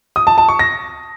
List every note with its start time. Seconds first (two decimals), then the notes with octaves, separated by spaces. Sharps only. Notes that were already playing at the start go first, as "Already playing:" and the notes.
0.16 D#6
0.27 A5
0.38 A5
0.49 C#6
0.59 A#6